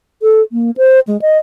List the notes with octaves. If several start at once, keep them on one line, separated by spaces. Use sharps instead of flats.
A4
A#3
C5
G#3
D#5